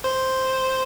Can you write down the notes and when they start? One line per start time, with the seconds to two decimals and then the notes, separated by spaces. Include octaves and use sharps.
0.04 C5